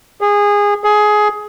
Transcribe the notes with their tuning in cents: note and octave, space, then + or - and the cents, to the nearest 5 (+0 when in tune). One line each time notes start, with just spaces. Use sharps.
G#4 -20
G#4 +15